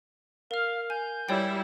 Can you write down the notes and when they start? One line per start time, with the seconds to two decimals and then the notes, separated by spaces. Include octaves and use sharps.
0.51 A#4 F5 F6
0.90 G#5 G6
1.29 G3 E4 C#5 D5 G5